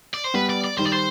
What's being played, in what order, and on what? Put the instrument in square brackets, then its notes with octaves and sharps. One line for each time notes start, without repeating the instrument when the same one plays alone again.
[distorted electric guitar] D5
C5
[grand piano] G3 B3 [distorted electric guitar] B4
[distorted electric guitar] D5
D5
[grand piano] D#3 G3 [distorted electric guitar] C5
[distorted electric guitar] D5
C5